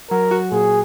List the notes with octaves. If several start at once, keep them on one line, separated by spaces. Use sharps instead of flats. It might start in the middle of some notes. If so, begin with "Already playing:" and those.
F#3 A#4
F#4
A#2 G#4